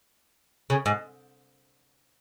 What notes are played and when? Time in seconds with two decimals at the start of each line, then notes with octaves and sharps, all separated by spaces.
0.70 C#3
0.86 G#2